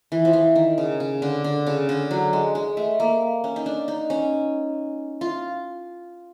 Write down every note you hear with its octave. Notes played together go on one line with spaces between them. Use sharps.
E3
F3
E3
D#3
C#3
C#3
D3
D3
C#3
D3
F#3
G#3
G#3
A3
A#3
C#4
D#4
D4
D#4
C#4
F4